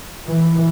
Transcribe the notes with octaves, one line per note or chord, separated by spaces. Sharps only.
E3